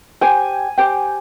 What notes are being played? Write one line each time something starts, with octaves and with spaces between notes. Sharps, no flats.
G4 C5 G5 G#5
G4 C5 G5